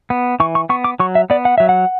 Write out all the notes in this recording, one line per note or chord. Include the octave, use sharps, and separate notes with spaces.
B3
E3 C#6
C#6
B3 C#6
D6
F#3 C#6
E5
B3 D5
F#5
F#3 E5
F#5